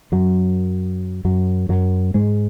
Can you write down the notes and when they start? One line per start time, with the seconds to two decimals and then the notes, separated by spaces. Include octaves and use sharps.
0.12 F#2 F#3
1.25 F#2 F#3
1.69 F#2 F#3
2.14 G#2 G#3